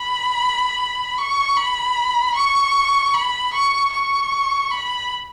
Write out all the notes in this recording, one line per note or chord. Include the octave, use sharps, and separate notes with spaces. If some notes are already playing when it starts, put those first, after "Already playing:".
Already playing: B5
C#6
B5
C#6
B5
C#6
C#6
B5